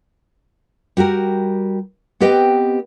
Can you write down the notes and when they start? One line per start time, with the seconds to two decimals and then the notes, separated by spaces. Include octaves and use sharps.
0.97 G3 F#4 G4 A#4
2.20 B3 C4 G4 B4 D#5 G5